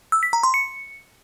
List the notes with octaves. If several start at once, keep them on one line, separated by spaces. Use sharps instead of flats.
E6
B6
A#5
C6
C#7